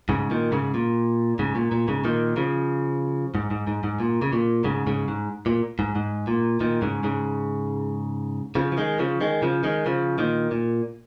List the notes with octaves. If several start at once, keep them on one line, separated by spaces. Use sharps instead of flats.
G#2 C#3
A#2 D#3
G#2 C#3
A#2
G#2 C#3
A#2
A#2
G#2 C#3
A#2 D#3
C#3 F3
G#2
G#2
G#2
G#2
A#2
C#3
A#2
G#2 C#3
G#2 C#3
G#2
A#2
G#2
G#2
A#2
A#2 D#3
G#2 C#3
G#2 C#3
C#3 F3
F3
D#3 G#3
C#3 F3
D#3 G#3
C#3 F3
D#3 G#3
C#3 F3
A#2 D#3
A#2